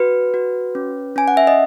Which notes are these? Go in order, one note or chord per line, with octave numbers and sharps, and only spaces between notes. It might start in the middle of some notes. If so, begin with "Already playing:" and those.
Already playing: F#4 B4
F#4
C#4
C#4 G#5
F#5
E5
D#5